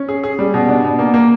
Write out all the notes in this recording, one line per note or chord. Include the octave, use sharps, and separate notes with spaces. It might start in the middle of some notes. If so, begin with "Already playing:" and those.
Already playing: C#4
G#4
G#4
G3
B2
D4
B2
A#3
A#3